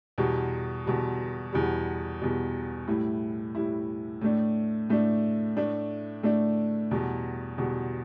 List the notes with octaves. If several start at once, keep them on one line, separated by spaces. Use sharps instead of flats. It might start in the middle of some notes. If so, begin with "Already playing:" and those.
E2 B2 G3
E2 B2 G3
E2 B2 G3
E2 B2 G3
A2 G3 E4
A2 G3 E4
A2 A3 D4
A2 A3 D4
A2 A3 D4
A2 A3 D4
E2 B2 G3
E2 B2 G3